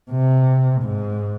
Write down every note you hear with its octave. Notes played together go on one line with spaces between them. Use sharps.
C3
G#2